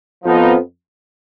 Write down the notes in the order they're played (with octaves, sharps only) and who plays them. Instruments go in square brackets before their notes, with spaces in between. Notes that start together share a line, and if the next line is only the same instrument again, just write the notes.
[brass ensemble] F2 F3 B3 D#4